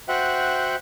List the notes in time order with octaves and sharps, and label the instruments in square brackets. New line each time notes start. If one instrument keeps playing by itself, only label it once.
[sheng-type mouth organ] F#4 C5 E5 F#5 G5 F#6